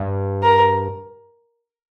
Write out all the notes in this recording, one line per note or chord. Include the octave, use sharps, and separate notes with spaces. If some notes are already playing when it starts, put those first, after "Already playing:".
Already playing: G2
A#4